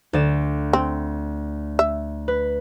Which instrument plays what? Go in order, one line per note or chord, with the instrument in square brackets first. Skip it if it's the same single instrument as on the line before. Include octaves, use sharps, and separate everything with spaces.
[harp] D2 D5 E7
[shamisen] C4
E5
[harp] B4